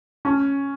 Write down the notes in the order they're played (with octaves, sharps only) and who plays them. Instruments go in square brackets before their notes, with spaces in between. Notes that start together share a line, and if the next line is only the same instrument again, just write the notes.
[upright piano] C#4